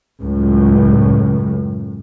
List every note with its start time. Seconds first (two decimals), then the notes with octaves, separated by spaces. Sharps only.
0.23 C#2 F#2 A2